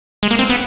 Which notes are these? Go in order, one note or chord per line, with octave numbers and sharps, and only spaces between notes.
G#3
A#3
C4
B3